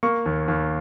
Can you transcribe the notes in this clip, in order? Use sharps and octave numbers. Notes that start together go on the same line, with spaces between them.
A#3 C#6
D#2
D#2